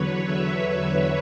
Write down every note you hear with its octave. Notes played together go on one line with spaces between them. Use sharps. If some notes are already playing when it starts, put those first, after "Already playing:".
Already playing: E2 D3 F#3 B4 C#5
E5